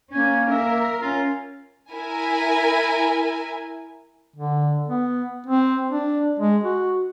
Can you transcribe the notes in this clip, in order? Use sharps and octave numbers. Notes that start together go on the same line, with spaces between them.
A#3 C#4 G#5
A#4 E5
C#4 F4
E4 A#4 G#5
D3
B3
C4
D4
G#3
F#4